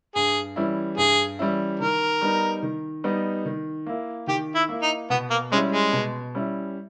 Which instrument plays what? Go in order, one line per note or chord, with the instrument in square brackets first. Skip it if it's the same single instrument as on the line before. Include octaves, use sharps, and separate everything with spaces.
[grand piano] G2 [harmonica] G#4
[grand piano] E3 G3 C#4 E4
[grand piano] G2 [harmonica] G#4
[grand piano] E3 G3 C#4 E4
[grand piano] D#3 [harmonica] A#4
[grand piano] G3 B3 D#4
D#3
G3 B3 D#4
D#3
A#3 E4
[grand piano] D#3 [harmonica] G4
[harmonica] E4
[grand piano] A#3 E4
[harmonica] D#4
[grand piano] B2 [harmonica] B3
[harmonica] A#3
[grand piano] G3 C#4 E4 [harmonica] G#3
[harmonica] G#3
[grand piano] B2
G3 C#4 E4